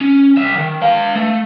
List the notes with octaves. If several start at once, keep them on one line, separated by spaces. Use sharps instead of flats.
C#4
C2 E5
D#3
B4 F5
A3